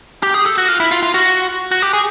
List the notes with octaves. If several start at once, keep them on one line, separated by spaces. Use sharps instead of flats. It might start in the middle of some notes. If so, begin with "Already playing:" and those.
G4
G#4
A4
F#4
F4
E4
F4
F4
F#4
F#4
G4
G#4